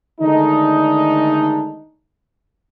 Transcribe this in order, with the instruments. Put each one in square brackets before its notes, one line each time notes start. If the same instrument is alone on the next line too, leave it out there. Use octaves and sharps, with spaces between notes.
[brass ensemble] D3 D#3 G#3 A3 D4 D#4